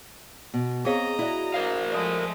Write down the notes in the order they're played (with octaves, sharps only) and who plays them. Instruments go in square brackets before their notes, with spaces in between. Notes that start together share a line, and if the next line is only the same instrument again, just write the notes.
[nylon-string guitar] B2
[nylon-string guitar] C4 C#5 [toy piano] G#4 F5 [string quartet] D#5 A#5
[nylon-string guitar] E4 F#4 [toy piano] C#5 D5
[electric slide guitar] A#4 C5 F5 [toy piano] D5
[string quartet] F3 G#3 A3 [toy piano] C#5 D5 D#6